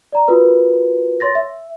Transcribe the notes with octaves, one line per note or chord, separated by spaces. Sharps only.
D5 A#5
F4 F#4 A#4 B4
C#5 C6 A6 A#6
E5